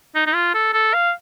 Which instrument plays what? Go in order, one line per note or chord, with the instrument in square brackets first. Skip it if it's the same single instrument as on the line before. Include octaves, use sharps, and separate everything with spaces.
[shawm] D#4
D#4
F4
A4
A4
F5